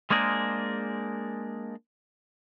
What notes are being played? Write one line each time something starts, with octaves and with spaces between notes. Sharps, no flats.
G#3 A#3 D4 G#4 A#4 C5